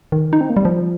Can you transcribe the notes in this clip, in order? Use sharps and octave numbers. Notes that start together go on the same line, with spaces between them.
D#3
D#4
C4
A#3
G3
F3